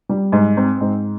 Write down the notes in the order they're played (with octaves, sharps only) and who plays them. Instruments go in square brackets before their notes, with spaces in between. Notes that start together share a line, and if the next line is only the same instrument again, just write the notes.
[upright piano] G3
G#2
C4
G#2